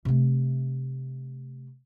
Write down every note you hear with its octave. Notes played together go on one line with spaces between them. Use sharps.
C3 A3